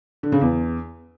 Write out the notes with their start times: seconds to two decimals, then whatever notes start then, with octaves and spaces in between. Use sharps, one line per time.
0.23 D3
0.32 C#3
0.41 E2